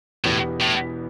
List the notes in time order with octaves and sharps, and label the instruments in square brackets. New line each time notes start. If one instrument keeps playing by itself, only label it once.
[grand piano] E1 E2 E3 B3 G4 [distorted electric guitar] A2
[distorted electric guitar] A2